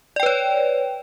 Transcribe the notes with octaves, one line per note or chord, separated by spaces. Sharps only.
B4 C#5 D5 G5